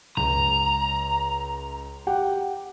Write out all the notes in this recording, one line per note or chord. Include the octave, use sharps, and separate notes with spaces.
C#2 A#5
G4 F#5 G5